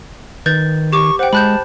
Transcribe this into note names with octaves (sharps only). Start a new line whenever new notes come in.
D#3 B4 G6 A6
G4 C#6 D6
C5 F#5 G5
G#3 A5 B5 F#6 G6